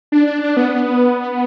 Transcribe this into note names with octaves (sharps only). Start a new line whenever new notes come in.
D4
D4
D4
B3